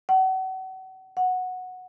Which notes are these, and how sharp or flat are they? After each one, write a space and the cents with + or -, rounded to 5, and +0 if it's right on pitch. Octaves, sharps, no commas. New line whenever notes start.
F#5 +35
F#5 -10